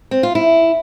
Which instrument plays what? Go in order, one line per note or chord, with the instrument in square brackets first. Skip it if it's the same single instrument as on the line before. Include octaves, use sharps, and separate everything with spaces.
[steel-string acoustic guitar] C4
F4
E4